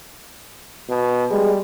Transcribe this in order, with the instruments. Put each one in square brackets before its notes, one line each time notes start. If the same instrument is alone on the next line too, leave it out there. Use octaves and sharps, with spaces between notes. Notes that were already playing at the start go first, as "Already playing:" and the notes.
[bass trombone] B2
[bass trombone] G3 [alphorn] G#3